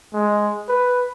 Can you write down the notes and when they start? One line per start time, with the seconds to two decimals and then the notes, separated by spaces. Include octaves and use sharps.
0.13 G#3
0.69 B4